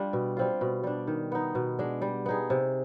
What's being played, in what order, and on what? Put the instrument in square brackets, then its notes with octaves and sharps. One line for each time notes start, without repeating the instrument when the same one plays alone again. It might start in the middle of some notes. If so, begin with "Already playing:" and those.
Already playing: [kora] G3 D4 F4
B2
G3 C4 F4
B2
G3 D4
D#3
B3 D#4
B2
G#3 D4
G3
B3 D#4 G#4
C3